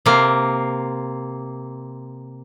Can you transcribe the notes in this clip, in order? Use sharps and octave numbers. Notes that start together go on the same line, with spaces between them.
C3 A#3